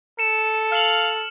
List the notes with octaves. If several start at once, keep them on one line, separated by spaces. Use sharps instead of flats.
A4 C#7 E7
F5 F6 F#7